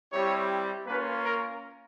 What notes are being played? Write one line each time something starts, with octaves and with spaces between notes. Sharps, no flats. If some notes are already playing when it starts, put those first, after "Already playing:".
G3 C4 E4 G4 C#5
A#3 C#4 F4 B4
A#4